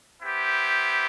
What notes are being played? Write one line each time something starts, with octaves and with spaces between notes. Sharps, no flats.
B3 E4 G4 C5